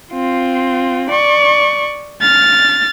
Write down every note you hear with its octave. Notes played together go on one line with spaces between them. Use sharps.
C4 F4
D5 C#6
F6 A6